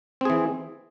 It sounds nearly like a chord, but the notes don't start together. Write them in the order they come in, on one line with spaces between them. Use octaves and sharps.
C4 G#4 E3